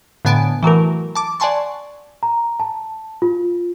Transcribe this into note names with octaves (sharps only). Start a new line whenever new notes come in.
A2 D3 B3 G#5 A5 D7
E3 F#3 A3 A#4
A5 D6
D5 F#5 G#5 A5 C6 C#6
A#5
A5
F4